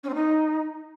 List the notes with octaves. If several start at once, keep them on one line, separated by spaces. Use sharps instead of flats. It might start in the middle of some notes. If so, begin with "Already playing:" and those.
C#4
C4
D#4